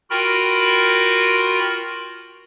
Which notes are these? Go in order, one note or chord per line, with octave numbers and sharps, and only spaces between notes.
F4 F#4 A#4 G5 B5 F6